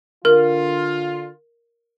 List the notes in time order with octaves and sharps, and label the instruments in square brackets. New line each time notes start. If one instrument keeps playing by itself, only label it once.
[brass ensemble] D3 F4 [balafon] A#4